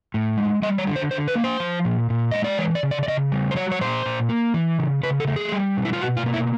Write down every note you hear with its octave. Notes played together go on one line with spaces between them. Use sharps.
A2
G#3
G3 D#5
C#5
D3
C5
D3 C5
B4
A#3
C5
F3
A#2
A#2
G#3 D#5
D5
E3 C#5
D5
C#3
D5
D5
C#3 D#5
G3
C5
F#3 C#5
C#5
A#2 C5
A#2
A#3
E3
C#3
C#3 B4
A4
A3
G#4
G3
B2
E4
F4
B2 F#4
F4
A#3
E4